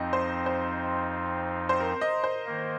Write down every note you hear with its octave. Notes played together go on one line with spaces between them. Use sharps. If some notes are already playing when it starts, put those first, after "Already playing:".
Already playing: F2 F3 C4 D#4 D#5
C5
C5
C5
A#4
D#5
C5
D#3 A#3